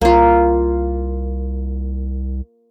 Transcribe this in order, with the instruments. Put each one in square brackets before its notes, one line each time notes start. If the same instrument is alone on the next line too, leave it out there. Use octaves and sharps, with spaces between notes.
[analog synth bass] C2 [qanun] A#3 F4